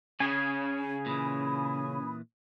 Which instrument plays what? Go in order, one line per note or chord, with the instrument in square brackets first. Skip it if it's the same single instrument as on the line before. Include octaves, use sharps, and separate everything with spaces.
[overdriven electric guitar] C#3 [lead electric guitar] C#4 [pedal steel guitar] G#4 G#5
[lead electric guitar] A#2 E3 [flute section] C#4 B5 D#6